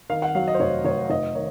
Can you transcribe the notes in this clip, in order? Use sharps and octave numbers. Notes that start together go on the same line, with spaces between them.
D#3 F5
F#5
F#3 F5
D#5
C5
F1 C#5
F1 C#5
F1 D#5
D#3 C#5